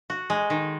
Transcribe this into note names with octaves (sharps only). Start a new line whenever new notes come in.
F#4
G#3
D#3